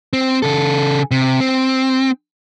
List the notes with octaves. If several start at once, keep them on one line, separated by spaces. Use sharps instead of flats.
C4
C#3 A4
C3
C4